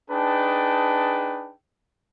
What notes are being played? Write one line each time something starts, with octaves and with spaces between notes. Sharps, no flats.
D4 D#4 G#4 B4 G5 A5